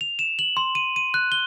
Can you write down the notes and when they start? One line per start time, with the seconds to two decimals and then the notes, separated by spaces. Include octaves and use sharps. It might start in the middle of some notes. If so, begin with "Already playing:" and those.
0.01 F7
0.19 E7
0.39 F#7
0.57 C6
0.75 D#7
0.96 D#7
1.14 F#6
1.32 G7